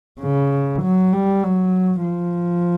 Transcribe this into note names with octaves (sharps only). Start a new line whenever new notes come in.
C#3
F#3
G3
F#3
F3